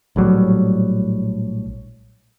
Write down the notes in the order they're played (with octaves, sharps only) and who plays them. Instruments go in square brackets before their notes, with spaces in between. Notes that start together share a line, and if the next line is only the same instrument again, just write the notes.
[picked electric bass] A#1 A2 F#3 G3